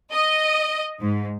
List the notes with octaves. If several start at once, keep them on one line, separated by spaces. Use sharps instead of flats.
D#5
G#2